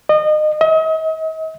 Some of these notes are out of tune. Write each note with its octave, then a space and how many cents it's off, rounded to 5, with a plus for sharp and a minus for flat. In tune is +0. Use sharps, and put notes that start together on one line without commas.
D#5 -30
D#5 +40